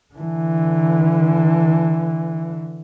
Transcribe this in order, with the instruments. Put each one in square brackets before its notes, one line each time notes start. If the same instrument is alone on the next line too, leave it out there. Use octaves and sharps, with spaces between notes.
[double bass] D3 E3